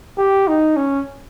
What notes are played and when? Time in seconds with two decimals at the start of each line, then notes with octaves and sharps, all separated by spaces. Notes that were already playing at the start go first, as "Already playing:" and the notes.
0.18 G4
0.48 D#4
0.77 C#4